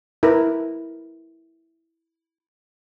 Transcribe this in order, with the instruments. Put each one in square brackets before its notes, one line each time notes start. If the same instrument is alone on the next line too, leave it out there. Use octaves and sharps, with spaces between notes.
[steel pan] E4 A#4 B4